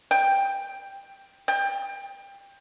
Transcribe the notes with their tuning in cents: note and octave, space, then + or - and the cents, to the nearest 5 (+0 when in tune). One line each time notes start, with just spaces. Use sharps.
G5 +10
G5 +20